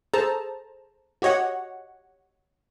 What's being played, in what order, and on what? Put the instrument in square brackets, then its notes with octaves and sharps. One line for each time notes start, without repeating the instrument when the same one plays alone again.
[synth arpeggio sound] G#4 A4 C5 A5 A#5
F#4 G4 C#5 D#5 F#5